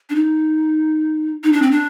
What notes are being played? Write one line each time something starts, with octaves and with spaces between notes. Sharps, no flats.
D4
D#4
D#4
D4
C4
D4